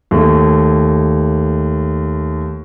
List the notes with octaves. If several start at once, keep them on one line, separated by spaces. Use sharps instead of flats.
D#2 A3